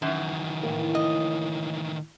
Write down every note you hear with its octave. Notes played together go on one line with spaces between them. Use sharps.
F#2 D#3 E3
A2 A#3
D#5